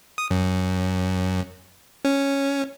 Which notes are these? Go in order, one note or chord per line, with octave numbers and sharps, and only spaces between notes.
D#6
F#2
C#4